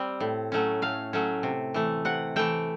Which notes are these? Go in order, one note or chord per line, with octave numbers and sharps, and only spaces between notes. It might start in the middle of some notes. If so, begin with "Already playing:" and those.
Already playing: G3 C4
A2
F#3 A3 C#4
A2 F5
F#3 A3 C#4
C3
E3 A3
C3 F#5
E3 A3 G5